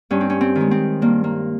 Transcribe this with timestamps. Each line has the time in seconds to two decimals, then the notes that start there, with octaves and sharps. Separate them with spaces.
0.11 G2 C#4
0.21 C4
0.30 C#4
0.41 C4
0.56 D#3
0.61 G#3
0.71 C4
1.02 G2 A#3
1.24 A#3